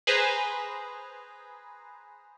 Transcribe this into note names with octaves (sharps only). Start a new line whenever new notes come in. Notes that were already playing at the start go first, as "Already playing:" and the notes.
G#4 B4 C5 A#5